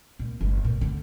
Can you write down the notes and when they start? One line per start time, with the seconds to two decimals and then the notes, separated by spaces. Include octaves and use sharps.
0.19 A#2
0.41 G1
0.65 A#2
0.81 D3